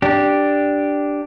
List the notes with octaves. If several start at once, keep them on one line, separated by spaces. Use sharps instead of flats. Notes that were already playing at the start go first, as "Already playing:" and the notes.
D4 G4